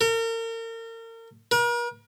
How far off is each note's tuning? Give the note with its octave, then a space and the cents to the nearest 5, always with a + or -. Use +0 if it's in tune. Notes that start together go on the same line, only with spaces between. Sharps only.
A#4 -35
A#4 +45